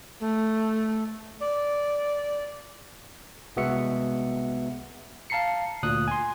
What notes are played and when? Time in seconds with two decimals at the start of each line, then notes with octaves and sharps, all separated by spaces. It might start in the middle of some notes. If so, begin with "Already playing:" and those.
0.20 A3
1.40 D5
3.56 C2 G#3 B3 F#4 E5 C#7
5.30 F5 A5 A#5 C7 C#7
5.83 D2 A#2 D#6 F#6
6.08 G#5 C6